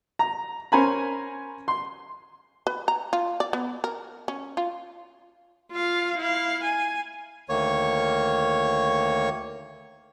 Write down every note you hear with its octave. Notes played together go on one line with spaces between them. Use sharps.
A#5
C#4 A#4 C5 G#5 A#5 B5
C6
B4
A#5
F4
D5
B3
A#4
C#4
F4
F4 F5
E4 F5
G#5
D2 D#3 A#3 C#5 C#6